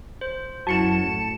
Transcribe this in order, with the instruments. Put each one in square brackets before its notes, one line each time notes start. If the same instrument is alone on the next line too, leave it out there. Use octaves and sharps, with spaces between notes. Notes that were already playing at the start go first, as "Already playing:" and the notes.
[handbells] C5
[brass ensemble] F#2 [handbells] E4 F#4 [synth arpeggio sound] A5 C#7 E7
[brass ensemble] A2